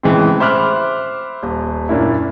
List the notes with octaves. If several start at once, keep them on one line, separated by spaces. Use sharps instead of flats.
A2 C#3 E3 G#3 C4
C5 E5 B5 D6 F6 F#6
D#1
F#2 A#2 A#3 D4 E4